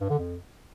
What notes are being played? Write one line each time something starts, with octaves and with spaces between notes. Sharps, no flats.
G2
D3
F2